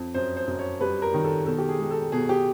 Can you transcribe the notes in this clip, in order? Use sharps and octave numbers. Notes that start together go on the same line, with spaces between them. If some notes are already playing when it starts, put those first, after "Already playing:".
Already playing: F2
F#2 C5
C5
F#2
C#5
G3 B4
A#4
D#3
A4
B2 A4
G4
G#4
G#3
A4
B2 G#4
G4